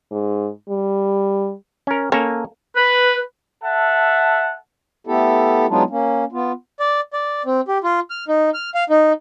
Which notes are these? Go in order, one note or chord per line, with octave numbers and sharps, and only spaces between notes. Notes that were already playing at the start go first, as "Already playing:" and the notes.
G#2
G3
C#4 A#4
A#3 C#4 A4 A#5
B4
A4 E5 F#5 A5
A3 B3 E4 G4 A4
F#3 G#3 B3 D4 D#4 F4
A#3 C#4
B3 F4
D5
D5
C4
G4
F4
F6
D#4
F6
F5
D#4